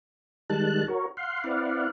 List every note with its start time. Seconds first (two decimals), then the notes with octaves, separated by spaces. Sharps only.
0.50 D#3 G3 G#3 A5 F#6
0.88 F#4 A#4 C#5
1.17 F5 F#5 C6
1.44 C4 E4 B4 D5 F5 F#5